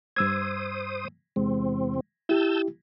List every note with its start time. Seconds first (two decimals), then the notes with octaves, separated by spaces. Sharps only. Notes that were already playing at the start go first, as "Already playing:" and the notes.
0.16 G2 C5 D#6 E6 G#6
1.36 E2 C3 G#3 C4
2.29 E4 G4 A5 E6 G6